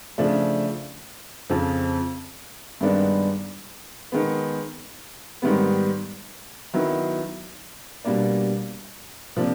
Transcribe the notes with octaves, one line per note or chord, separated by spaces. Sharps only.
C#3 F3 A3 D4
F2 C#3 F3
G2 D#3 G#3 B3 D4
D#3 G#3 B3
G#2 D#3 G3 B3
D#3 F#3 B3 E4
B2 G3 A#3 D4
C3 F3 A#3 D4